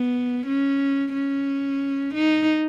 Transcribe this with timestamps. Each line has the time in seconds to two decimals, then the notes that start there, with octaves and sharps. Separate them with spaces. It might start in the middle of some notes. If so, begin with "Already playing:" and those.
Already playing: B3
0.47 C#4
1.14 C#4
2.14 D#4